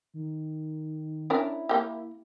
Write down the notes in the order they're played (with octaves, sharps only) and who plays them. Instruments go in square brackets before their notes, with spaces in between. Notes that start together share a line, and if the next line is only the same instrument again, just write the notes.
[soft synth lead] D#3
[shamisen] C#4 D4 A#4 [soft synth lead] E4
[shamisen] A#3 G4